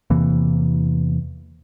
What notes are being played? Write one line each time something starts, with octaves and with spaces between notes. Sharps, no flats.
E2 C3 E3 A#3